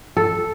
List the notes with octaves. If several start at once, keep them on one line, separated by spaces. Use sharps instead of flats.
A4